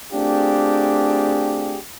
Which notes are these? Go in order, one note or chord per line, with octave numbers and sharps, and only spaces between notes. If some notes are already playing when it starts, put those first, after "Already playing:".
A3 C4 D4 F4 G4 G#4